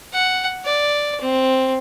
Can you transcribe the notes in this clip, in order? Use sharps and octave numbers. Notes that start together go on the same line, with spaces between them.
F#5
D5
C4